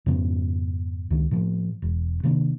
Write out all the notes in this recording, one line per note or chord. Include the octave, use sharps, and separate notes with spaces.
F2 G#2 C#3 B3
C#2 D#3
A2 F3
E1
C3 D#3 A#3 D4